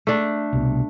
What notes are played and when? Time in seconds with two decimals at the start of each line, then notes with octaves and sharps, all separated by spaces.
0.07 A3 D4
0.53 C2 B2